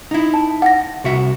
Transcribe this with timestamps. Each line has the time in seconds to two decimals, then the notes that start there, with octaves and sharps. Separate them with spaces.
0.11 D#4 E4
0.34 A5
0.62 F#5 A#6
1.04 C2 F#4 E5